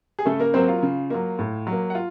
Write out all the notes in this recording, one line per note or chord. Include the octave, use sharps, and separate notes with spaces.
G#4
C#3 A3 A4
A#3 A#4
F#3 A#3 C4 C5
F4 F5
C#3
F#3 A#3
A2
F#3
A#3
F#5
F4